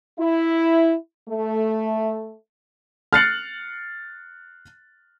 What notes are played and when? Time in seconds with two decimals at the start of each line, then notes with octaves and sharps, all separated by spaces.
0.19 E4
1.29 A3
3.13 F6 F#6 A6 C7 C#7 F#7